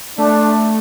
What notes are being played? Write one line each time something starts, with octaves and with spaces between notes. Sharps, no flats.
A3 D4